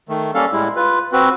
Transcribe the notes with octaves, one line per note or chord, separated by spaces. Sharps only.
D#3 A3
G3 A#3 C#4 A4 F5
A2 G3 G#3 E4
F4 B4
C4 F#4 B4